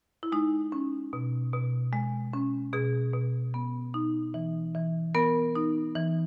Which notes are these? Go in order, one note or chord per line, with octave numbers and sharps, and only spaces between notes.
E4
G#3 D#4
C#4
B2
B2
G#3
C#4
B2 G#4
B2
B3
D#4
E3
E3
B3 A#4
D#4
E3